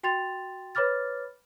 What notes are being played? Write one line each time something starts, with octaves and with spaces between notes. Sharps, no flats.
F#4 G5 C6 A6 F7
B4 C#5 B5 D6 F6 A6